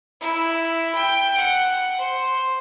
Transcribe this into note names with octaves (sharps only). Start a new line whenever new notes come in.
E4
G5
F#5
C5